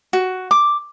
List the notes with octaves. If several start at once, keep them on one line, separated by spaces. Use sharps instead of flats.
F#4
D6